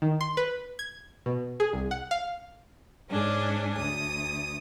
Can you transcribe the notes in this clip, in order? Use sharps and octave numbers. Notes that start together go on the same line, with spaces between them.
D#3
C6
B4
G#6
B2
G#4
C2
F#5
F5
G#2 C#4 D4 G#4
D2 D#6